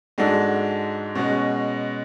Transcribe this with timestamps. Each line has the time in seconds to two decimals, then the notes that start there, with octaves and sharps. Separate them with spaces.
0.18 G#2 G#3 D4 F#4 A4
1.15 B2 G#3 C#4 F#4